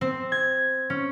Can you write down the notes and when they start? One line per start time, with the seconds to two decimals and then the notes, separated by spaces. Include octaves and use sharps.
0.01 C4
0.32 G#6
0.90 C#4